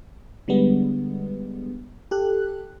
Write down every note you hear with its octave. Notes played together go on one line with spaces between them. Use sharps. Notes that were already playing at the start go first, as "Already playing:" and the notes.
D3 G3 G#3 B3
G4 A4 F#6